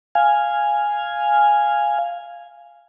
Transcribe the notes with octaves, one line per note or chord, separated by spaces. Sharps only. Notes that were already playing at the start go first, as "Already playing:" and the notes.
F5 G#5